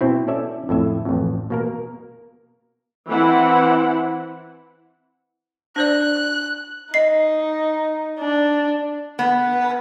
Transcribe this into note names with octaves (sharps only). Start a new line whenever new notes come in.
B2 C4 E4
C#4 A4 D5 E5
F2 A2 E5
A1 F2
B2 A#3 A#4
E3 C4 E4 F#5
D4 C5 D5 F#6
D#4 D#5 C7
D4
B3